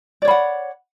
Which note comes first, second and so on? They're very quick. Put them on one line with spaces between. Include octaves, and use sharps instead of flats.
D5 C#5 B5 F#5